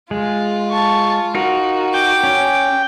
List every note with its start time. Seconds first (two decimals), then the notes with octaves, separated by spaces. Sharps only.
0.11 G#3 F4
0.70 A5 C#6
1.35 D#4 F#4 A#4
1.94 G5 D6
2.24 C#4